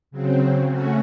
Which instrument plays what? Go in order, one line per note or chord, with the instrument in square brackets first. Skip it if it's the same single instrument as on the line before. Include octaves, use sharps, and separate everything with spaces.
[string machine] C#3 F#3 C4
C#3 A3 C#4 F#4